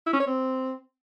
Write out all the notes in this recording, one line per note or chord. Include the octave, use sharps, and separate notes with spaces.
E4
C#4
C#5
C4